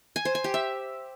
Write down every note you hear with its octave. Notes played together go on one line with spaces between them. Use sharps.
G#5
C5
G#5
G4
E5